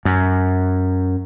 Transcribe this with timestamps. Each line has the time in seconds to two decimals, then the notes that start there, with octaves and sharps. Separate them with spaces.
0.05 F#2